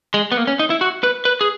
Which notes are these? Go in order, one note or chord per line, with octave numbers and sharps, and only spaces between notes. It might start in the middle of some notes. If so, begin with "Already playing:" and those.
G#3
B3
A#3
C#4
D#4
E4
F#4
B4
B4
G#4